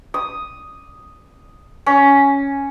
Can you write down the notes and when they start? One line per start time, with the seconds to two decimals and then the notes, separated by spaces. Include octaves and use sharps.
0.14 D#6
1.86 C#4